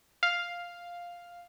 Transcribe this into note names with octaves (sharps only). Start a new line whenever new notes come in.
F5